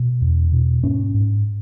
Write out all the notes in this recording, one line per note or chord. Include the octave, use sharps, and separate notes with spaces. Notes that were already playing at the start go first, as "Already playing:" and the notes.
Already playing: B2
E2
B2
G#2 C#4
G#2